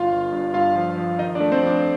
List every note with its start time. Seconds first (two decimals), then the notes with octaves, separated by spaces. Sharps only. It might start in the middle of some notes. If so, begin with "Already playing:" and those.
Already playing: G1 F4 F5
0.12 G1
0.32 G2
0.54 G2 F4 F5
0.76 F3
0.97 F3
1.19 D#3 D#4 D#5
1.35 D4 D5
1.40 A3
1.52 C4 C5
1.62 F2 D4 D5